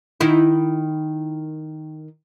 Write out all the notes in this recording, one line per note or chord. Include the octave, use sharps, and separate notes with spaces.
D#3 D#4 E4